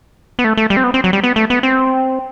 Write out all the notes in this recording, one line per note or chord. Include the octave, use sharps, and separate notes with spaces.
B3
A3
A3
G3
C4
B3
C4
F#3
G3
B3
A3
B3
C4